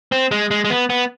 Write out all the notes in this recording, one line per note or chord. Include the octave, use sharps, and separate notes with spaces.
C4
G#3
G#3
G#3
B3
B3